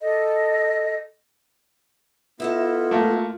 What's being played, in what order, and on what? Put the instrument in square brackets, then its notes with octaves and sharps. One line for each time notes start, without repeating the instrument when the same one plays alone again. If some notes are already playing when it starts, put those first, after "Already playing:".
[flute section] A4 D5 D#5
[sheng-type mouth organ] B3 E4 [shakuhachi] F4 [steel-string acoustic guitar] A4 D#5 E5
[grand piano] A3 A#3